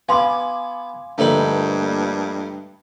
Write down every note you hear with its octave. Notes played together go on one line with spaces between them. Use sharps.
B3 F5 G#5 C6 D6
G2 D3 F3 A3 A#3 D#4 B4